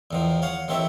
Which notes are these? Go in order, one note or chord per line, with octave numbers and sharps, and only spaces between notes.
E2 D#3 F3
C#5 F5 F#5
A1 D#3 C4 C#5 E5